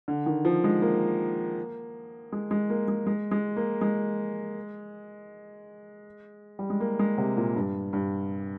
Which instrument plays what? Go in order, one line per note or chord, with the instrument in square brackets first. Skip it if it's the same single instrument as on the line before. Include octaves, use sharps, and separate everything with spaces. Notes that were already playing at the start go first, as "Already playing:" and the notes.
[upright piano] D3
D#3
F3
G#3
A#3
G#3
G#3
A#3
G#3
G#3
G#3
A#3
G#3
G3
G#3
A#3
G#3
C3
A#2
G2
G2